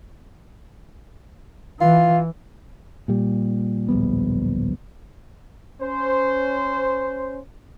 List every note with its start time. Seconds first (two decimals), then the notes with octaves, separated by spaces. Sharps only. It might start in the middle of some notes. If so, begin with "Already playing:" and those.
1.81 E3 F4
3.08 A#2 G3
3.88 D1 A#1 G3 B3
5.81 C#4 C5